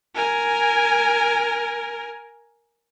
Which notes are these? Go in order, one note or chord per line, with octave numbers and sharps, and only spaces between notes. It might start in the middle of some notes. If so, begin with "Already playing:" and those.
A#4 G#5